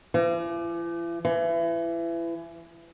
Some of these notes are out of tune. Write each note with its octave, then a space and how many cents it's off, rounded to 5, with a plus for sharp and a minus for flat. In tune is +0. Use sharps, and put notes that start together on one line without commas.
E3 +45
E3 +30